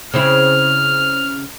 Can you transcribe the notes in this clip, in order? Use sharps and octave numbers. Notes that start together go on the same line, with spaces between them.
C#3 C4 E4 F6